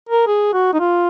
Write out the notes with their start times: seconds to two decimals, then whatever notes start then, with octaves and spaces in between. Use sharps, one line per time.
0.09 A#4
0.27 G#4
0.53 F#4
0.74 D#4
0.80 F4